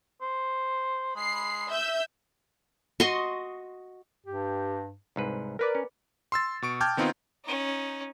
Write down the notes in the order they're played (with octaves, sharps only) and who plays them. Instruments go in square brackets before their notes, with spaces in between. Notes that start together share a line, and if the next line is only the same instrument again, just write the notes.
[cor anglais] C5
[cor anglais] G#3 [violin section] B5 C7
[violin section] E5 E6 G6
[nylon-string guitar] F#4 [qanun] D#5 C6 C#6
[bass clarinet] G2 [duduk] G4
[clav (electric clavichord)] C2 G#2 B4
[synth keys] A#4 B4 D5
[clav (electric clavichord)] C#4
[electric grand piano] C6 E6 A6
B2 C#6 D7
G5 A5 D6 F6 G6 G#6
D#3 B3 C4 D#4 F4
[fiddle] C#4 D#4